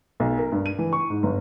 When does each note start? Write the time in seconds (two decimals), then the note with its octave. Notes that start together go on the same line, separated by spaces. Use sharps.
0.20 B1
0.38 A#4
0.52 G2
0.66 D#7
0.79 E3
0.93 C#6
1.10 G#2
1.23 G1